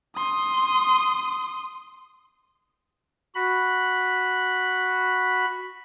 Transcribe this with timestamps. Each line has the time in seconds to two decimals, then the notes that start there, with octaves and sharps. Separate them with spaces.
0.16 C6 D#6
3.35 F#4 B5